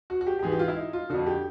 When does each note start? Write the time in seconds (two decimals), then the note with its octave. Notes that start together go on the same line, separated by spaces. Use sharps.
0.10 F#4
0.21 F#4
0.27 G4
0.39 G4
0.43 G#2 E3 G#4
0.52 G4
0.59 F4
0.68 E4
0.76 D#4
0.93 F4
1.10 F2 D3 F#4
1.26 G4